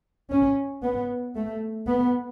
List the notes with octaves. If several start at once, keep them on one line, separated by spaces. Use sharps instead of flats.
C#4
B3
A3
B3